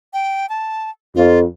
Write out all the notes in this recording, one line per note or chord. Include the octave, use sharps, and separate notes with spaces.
G5
A5
F2 F4